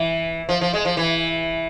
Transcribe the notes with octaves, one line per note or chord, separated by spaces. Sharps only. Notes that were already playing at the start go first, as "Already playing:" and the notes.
Already playing: E3
F3
F3
G#3
F3
E3